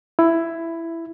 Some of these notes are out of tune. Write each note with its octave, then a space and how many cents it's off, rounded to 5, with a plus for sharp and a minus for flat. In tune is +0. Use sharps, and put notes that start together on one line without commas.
E4 +10